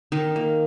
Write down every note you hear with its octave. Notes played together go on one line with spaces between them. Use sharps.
D#3 D#4
A#3